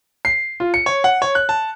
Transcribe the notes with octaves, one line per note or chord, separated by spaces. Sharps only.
C7
F4
C#7
C#5
F#5
C#5
F#6
A5